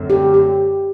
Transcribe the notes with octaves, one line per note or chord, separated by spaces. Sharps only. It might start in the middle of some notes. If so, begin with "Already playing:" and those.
Already playing: F#2 D3 F#3 A3 C4
G4
G4